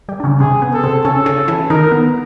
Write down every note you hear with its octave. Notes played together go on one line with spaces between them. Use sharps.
G3 G4
D4
C#3 C#4
C3 C4 G#4
B3
A4
C3 C4
C#3 C#4 A4
C#3 C#4
E3 E4
D#3 D#4 A#4
B3